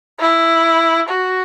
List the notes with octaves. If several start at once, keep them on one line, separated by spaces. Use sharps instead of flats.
E4
F#4